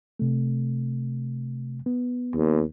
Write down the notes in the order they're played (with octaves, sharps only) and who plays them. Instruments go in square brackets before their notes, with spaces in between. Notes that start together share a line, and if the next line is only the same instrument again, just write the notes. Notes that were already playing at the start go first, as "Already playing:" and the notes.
[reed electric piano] C3 A3
B3
[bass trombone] D#2